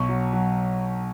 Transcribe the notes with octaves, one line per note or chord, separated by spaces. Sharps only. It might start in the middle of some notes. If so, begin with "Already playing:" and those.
Already playing: B1 C#6
F#3
F#3